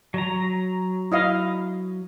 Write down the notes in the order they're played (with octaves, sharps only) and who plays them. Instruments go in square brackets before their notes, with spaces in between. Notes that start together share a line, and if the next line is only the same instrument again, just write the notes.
[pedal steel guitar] F#3 A#5
[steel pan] E4 D#5 F5